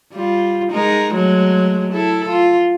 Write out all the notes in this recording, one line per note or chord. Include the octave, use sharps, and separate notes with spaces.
G3 F4
G#3 D#4 A#4
F#3 G#3 A3
E4 A4
F4